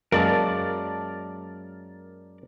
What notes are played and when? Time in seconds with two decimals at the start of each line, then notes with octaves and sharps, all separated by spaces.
0.12 F#2 G#3 A#3 A#4 D5 A5